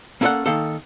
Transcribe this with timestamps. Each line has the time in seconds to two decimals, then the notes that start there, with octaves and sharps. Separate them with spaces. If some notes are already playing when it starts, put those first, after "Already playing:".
0.21 A#3 C#4 A4 B4 D5 F#5
0.46 D#3 A#3 A4